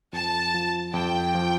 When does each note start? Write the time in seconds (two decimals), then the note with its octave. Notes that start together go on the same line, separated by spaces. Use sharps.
0.13 F2 A5
0.54 F3
0.94 F2 G5
1.35 F3